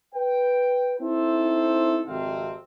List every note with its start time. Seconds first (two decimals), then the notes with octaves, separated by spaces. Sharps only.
0.13 B4 G5
1.00 C4 D#4 E4 A4 C5
2.05 G#1 F2 C3 C4 F5